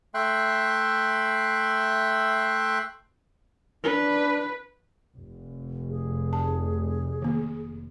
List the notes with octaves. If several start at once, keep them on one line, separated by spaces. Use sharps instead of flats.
A3 E5 G5 C6 F#6
D4 B4
F1
G#4
A5
D#3 A#3